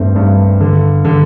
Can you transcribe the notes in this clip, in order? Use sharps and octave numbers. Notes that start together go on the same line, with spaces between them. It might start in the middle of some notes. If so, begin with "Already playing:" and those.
Already playing: G2 D#3 A3 C4
G2
D3
D3